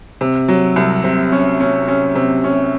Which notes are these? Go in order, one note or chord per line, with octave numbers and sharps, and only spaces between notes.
C3
F#3
C2
C3
C#4
C#4
C#4
C3
C#4